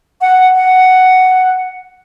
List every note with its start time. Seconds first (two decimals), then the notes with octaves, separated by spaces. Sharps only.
0.21 F#5
0.55 F#5